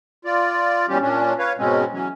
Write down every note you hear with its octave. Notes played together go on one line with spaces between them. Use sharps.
F4 D5
B2 E3 G3 C#4 G4
A#2 C#4 D4
B4 C#5 F5
G#2 B2 G#3 C4 C#4
E3 F#3 C#4